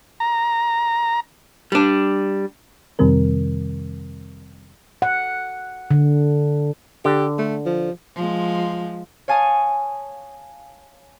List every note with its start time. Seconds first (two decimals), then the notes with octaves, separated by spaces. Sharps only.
0.20 A#5
1.72 G3 D4
2.99 F2 C3 D#3 G3 C4 A#4
5.02 F#5
5.91 D3
7.05 D3 G4
7.38 A3
7.66 F3
8.15 F3 G#3
9.28 C#5 F5 G#5 A5 D#6